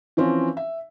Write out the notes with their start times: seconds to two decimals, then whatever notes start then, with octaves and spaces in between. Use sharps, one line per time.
0.17 E3 F3 C4 C#4
0.57 E5